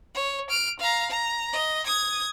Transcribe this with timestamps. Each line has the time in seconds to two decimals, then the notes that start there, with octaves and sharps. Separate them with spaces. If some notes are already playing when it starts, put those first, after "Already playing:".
0.14 C#5
0.50 F6 D7
0.80 F5 A#5
1.10 A#5
1.53 D#5
1.86 D#6 G#6